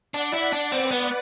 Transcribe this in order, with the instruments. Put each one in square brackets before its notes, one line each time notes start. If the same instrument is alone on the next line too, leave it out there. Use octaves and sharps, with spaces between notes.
[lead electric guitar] D4 [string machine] D5 F#5
[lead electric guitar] E4
D4
[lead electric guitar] C4 [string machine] B4 D5
[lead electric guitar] B3